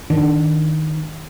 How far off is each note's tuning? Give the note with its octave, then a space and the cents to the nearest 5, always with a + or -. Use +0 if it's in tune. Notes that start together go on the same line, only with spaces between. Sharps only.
D#3 +5 D4 +0